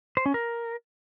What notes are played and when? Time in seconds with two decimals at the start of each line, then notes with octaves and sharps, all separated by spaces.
0.17 C5
0.26 C#4
0.34 A#4